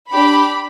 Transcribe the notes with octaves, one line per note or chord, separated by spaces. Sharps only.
D4 G4 B5